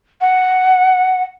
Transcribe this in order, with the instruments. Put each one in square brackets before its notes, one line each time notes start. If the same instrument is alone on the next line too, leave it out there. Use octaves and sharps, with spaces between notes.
[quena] F#5